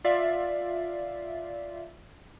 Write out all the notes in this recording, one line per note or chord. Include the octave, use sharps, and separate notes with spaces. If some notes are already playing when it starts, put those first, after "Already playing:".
F4 D5 E5 F5